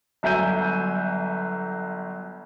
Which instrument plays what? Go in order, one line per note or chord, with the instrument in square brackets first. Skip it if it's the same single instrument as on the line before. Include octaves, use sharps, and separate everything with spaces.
[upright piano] G1 F#3 E5 G#5 G6 D#7